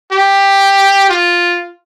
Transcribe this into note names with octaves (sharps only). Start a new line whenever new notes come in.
G4
F4